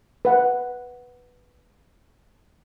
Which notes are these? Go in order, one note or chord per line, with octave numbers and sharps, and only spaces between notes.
B4 F#5